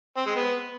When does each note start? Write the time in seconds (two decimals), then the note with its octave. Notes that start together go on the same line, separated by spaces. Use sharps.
0.17 C4
0.27 G#3
0.36 B3